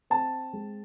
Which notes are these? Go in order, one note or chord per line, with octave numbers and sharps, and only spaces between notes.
C4 A5
G#3